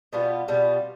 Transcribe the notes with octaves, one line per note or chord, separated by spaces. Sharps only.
B2 G3 B3 F4
B2 G3 B3 F4